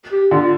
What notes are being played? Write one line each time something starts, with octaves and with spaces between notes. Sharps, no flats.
G4
D3 F4